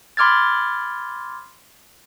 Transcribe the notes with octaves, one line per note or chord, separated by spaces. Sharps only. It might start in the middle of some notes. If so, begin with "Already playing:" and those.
B5 C6 D6 F6 G#6 A6